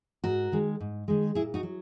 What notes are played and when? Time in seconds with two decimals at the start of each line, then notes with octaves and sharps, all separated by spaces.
0.24 G#2 F#4 A#4
0.52 D#3 G#3
0.80 G#2
1.08 D#3 G#3
1.35 A#2 E4 G#4
1.54 D#4 F#4
1.63 F#3